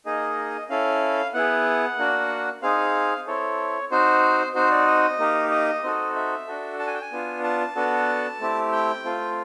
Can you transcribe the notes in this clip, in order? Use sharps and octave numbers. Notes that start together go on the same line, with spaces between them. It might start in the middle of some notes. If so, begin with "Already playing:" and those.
A#3 D#4 G#4 D#5
C#4 E4 A4 F5
B3 E4 G#4 F#5
A#3 D4 F#4
C4 D#4 G#4 F5
C4 E4 A4 C#5
C4 D#4 F#4 C5
C4 D#4 F#4 C5
D5
D#5
A#3 D#4 G4
D#5
C4 D#4 F#4 A4
E5
D4 F#4 A4
A5
G#5
G5
G#5
B3 D4 F4
A5
B3 D4 F#4 A4
A3 C4 E4 G4
G5
A3 C4 F4